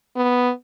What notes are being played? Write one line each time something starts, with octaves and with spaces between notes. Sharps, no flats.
B3